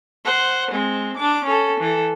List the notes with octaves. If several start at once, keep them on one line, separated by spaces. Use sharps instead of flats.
C5 F#5
G#3 C4
D4 D6
C#4 A4
E3 A4